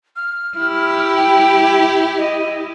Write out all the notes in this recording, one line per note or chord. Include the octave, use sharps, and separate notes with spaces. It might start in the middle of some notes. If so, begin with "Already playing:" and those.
F6
E4 G4
G5
D#5